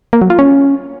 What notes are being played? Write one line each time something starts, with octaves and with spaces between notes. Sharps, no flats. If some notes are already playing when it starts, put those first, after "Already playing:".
A#3
F#3
F4
C#4